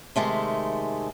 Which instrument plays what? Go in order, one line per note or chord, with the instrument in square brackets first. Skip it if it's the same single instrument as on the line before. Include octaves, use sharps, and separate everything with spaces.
[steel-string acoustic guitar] C3 D#3 G#3 A3